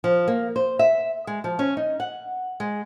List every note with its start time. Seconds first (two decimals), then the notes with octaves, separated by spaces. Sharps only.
0.04 F3
0.28 A#3
0.56 C5
0.79 E5
1.27 G#3
1.44 F3
1.59 C#4
1.77 D#4
2.00 F#5
2.60 G#3